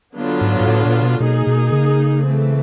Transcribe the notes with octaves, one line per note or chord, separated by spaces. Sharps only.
D3 F#3 B3 D4 F4
G#2
G#2
A2
A#2
B2
B2 A#3 D#4 G#4
B2
C#3
E3 A3 C4